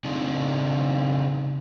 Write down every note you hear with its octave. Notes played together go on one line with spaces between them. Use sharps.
C#3 C4 D4 D#4